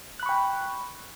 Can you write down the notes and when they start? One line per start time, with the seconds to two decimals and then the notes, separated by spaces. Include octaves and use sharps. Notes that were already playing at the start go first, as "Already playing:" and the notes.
0.19 F#6
0.23 B5
0.26 C#6
0.29 G5